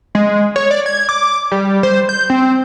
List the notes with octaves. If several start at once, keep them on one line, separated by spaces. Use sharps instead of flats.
G#3
C#5
D5
G#6
D6
G3
C5
G6
C4